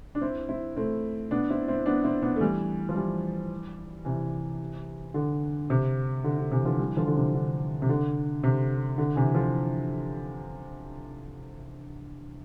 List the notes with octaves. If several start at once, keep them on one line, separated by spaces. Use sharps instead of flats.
D4
C4 E4
C4 E4
A3 C4
B3 D4
C4 E4
C4 E4
B3 D4
C4 E4
B3 D4
A3
E3 G3
F3
E3 G3
C3 E3
D3
C3
D3
D3
C3 E3
D3 F3
E3 G3
D3 F3
D3
C3
D3
C3
D3
C3
D3
C3 E3
D3 F3